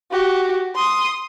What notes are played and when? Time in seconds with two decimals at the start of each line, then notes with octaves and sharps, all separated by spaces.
0.11 F#4 G4
0.75 C6 D#6